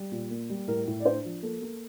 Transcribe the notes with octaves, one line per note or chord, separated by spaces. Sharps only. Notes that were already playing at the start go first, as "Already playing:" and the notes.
Already playing: G3
A#2
A#3
G3
A2 A#4
A2
D5
D4 C5
F3
A#3 A4
A#3